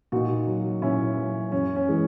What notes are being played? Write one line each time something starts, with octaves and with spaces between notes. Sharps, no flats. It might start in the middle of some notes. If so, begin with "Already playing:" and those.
A#2 D#4 F#4
F#3
A#2 C#4 E4
F#3
F#2 C#4
C#4
E3 G#3